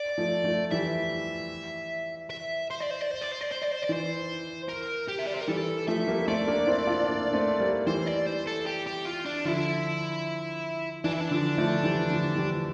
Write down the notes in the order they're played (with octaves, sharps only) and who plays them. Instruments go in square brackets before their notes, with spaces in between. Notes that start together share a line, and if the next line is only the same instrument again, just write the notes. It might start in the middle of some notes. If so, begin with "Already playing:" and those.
Already playing: [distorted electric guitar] D5
[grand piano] F3 A3
F3 A3
[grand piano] E3 G3 [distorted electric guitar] E5
[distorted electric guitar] E5
C5
D5
C5
D5
C5
D5
C5
D5
C5
D5
C5
D5
[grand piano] E3 [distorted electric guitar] C5
[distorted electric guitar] A#4
G4
E5
D5
C5
A#4
[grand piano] E3 G3 [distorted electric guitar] A4
[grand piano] F3 A3 [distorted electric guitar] E5
[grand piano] G3 A#3
[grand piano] A3 C4 [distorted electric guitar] D5
[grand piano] A#3 D4
C4 E4
D4 F4
A#3 D4
D4
A3 C4
G3 A#3
[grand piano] E3 G3 [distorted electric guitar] C5
[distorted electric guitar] D5
C5
A4
G4
G4
F4
D4
[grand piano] D3 F3 [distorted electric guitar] E4
[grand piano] E3 [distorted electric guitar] D4
[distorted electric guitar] E4
D4
[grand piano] D3 F3
F3 A3
E3 G3
D3 F3
E3 G3